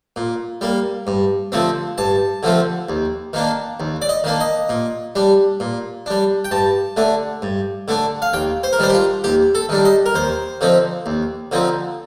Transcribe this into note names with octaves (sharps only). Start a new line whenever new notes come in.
A#2
G3 A#3
G2
D3 F3 A3 C4
G2 A5
D3 F3 A3 C4
D#2
D#3 A#3 D4
D#2
D5
D#5
D#3 A#3 D4
D#5
A#2
G3 D4
A#2
G3 D4
G5
G2 A5
D3 A3 D4
G2
D3 A3 D4
F5
D#2 G5
C5
A#4
D#3 G3 D4 C5
G4
F4
D#2 G4
A4
D#3 G3 D4
D#5
A#4
D#2 C5
D3 F3 C4 D#4
D#2
D3 F3 C4 D#4